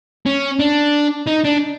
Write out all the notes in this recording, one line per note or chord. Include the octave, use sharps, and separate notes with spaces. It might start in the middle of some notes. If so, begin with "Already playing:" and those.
C#4
D4
D#4
D4